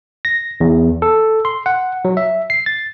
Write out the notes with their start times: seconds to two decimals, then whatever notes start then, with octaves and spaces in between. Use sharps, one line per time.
0.25 A#6
0.61 E2
1.02 A4
1.45 C6
1.66 F#5
2.05 F#3
2.17 E5
2.50 C7
2.66 A6